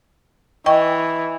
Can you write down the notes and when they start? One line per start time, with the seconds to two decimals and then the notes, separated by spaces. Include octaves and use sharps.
0.66 E3 D#5 G5 C#6